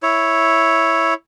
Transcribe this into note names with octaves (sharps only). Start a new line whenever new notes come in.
E4 C#5